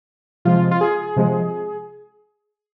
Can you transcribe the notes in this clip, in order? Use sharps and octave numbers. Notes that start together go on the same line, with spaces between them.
C3 F3 G#3 F4
F4
G#4
C3 F3 G#3